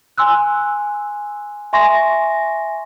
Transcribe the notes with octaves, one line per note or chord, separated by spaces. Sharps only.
G#5 C6 E6 F#6
E5 G#5 C6 C#6 A#6